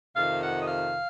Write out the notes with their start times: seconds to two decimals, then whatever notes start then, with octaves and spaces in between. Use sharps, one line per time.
0.15 F2 C3 D#3 F5
0.42 F#5
0.61 D#5
0.67 F5